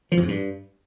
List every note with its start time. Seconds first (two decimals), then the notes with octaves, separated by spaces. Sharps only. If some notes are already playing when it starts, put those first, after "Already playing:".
0.12 F3
0.17 F2
0.23 G#2
0.28 G2